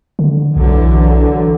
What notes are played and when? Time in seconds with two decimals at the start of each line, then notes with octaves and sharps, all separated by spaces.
0.19 D3
0.56 B1 D3 E3 F#3